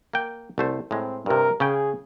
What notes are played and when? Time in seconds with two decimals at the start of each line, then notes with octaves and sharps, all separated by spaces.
0.13 A#3 G5
0.58 C2 A3 C5
0.91 A2 G#3 C4
1.26 G2 C3 A#4
1.60 C#3 C#4 G#4 G5